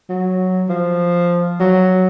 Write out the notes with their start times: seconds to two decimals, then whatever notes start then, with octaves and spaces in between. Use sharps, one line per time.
0.09 F#3
0.69 F3
1.60 F#3